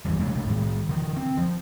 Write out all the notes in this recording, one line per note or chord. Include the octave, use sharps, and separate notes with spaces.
F1 F#2 E3 G3
C3 G#3 A3
A2 D#3
D3 E3
C4
F3